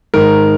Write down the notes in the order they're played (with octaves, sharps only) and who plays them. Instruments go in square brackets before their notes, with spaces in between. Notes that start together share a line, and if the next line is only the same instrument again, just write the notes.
[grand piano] G#2 D#3 A#4